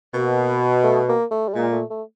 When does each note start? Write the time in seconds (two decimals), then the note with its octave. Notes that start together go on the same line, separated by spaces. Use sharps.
0.13 B2 A#3
0.83 A3
1.08 A#3
1.31 A3
1.48 G3
1.54 A#2 G#3
1.72 A3
1.90 A3